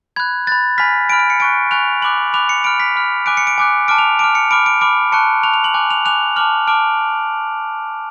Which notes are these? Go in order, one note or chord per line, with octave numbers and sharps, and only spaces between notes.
B5 F#6 G#6
B5 F#6 A6
G#5 B5 F6 B6
G#5 B5 F6 D7
D7
C#7
G#5 C#6 F#6 D7
G#5 C#6 F#6 F7
B5 D6 F#6 F#7
B5 D6 F#6 F7
C#7
B5 F6 D7
B6
B5 F6
G#5 D6 F#6 D7
C#7
D7
G#5 D6 F#6
A5 D6 F6 D7
F7
A5 D6 F6 D7
C#7
B5 D6 F6 D7
D7
B5 D6 F6 D7
A5 C#6 F#6 C#7
A5 C#6 F#6 F7
F7
F#7
G#5 D6 F#6
F7
G#5 D6 F#6 F7
A5 D6 F6 F#7
A5 D6 F6 D7